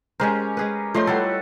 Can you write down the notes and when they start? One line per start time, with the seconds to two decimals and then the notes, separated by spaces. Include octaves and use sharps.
0.20 G#3 C#4 G4 A#4 C5
0.57 G#3 G#4 B4
0.94 F3 A3 F4 C5 C#5 D#5 C6
1.07 G3 A3 E4 A4 B4 F#5